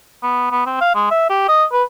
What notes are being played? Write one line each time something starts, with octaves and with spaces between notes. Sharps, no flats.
B3
B3
C4
F5
G#3
E5
G4
D#5
B4